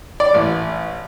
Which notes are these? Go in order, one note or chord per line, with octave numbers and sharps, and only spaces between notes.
D5
A1